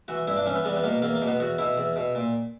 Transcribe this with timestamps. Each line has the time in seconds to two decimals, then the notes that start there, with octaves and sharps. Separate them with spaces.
0.08 E3 F#4
0.27 G2 E4
0.37 D4
0.46 E3 C#4
0.55 B3
0.65 E2 G3
0.76 B3
0.84 B2 A#3
1.02 E2 A#3
1.15 A#3
1.22 B2
1.28 B3
1.40 E2 F#4
1.58 B2 E4
1.77 E2
1.96 B2
2.15 A#2